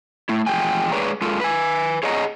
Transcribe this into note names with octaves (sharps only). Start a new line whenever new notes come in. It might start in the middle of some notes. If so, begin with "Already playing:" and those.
A3 E4
E2 F3 G#3 G5 G#5
G#3 G#4 B4 C#5 D5 A#5
G#3 F4 A4 A#4
B4 G#5
G#4 C#5 D#5 F#5 G#5 A#5